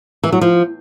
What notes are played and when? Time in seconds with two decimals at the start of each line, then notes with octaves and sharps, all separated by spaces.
0.24 E3
0.32 F#3
0.41 F3